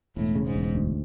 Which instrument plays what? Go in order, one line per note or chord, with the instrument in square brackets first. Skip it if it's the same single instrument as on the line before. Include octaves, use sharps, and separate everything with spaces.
[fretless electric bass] E1 [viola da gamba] A2
[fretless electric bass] C#3
[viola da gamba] G#2
[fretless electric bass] E1
D2